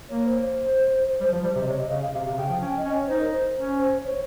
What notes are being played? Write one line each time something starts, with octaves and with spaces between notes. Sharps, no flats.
A#3 C#5
C5
G3 C5
F3
C5
G3
C3 C5
D#5
C3 C#5
D#5
C#3 F5
F5
C3 F5
C3
C#3 G5
F3
C#4 G5
D#5
C#4
C#5
D#4 C5
A#4
C5
C#4
C5
C#5